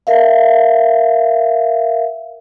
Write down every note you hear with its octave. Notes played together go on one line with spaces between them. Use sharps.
A#4 E5 F5